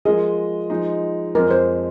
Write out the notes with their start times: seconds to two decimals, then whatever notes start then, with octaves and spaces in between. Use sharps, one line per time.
0.05 F3 G#3 F4 G#4 A#4 D#5
0.70 F3 G#3 D#4
1.35 F2 F3 G#3 A#4
1.51 C5